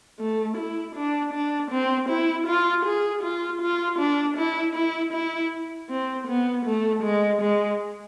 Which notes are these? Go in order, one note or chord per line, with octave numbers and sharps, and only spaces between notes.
A3
E4
D4
D4
C4
E4
F4
G#4
F4
F4
D4
E4
E4
E4
C4
B3
A3
G#3
G#3